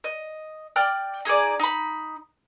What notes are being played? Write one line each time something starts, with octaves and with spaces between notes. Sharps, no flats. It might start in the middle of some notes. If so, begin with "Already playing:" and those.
D#5
D5 G5 F6 F#6
D#4 G#4 A4 D5
D#4 B5